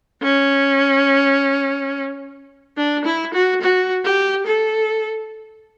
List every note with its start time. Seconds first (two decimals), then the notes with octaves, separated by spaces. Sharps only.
0.22 C#4
2.77 D4
3.05 E4
3.34 F#4
3.61 F#4
4.04 G4
4.46 A4